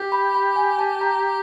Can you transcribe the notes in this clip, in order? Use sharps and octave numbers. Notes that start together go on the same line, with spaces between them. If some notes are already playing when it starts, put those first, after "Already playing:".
Already playing: G4
B5
B5
G#5
A5
A#5